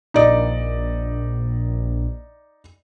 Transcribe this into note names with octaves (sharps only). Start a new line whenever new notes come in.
A#1 D#4 D5 D#5